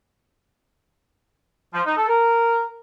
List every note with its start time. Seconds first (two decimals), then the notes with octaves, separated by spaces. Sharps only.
1.74 F3
1.85 D#4
1.97 A4
2.08 A#4